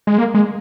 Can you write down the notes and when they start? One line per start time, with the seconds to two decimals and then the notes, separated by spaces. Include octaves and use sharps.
0.07 G#3
0.18 A#3
0.34 G#3